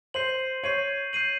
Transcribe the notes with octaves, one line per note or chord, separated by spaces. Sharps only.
C5 G6 C7 D#7 F#7
C#5 G6 C7 D#7 F#7
G6 C7 D#7 F#7